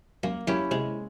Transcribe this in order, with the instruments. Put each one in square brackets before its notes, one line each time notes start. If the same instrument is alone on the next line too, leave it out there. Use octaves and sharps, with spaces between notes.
[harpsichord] F#2 [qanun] A#3
[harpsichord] F#2 [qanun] C#4 E4 G4
[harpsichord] C3 [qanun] G#3